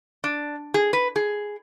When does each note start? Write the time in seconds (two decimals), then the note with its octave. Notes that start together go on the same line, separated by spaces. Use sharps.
0.24 D4
0.74 G#4
0.93 B4
1.16 G#4